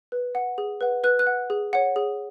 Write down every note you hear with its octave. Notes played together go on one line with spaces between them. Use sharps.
B4
F#5
G#4
B4 F#5
B4 F#6
F#6
F#5
G#4
C#5 F#5
G#4